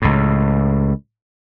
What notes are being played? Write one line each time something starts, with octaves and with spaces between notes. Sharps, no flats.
C#2 A2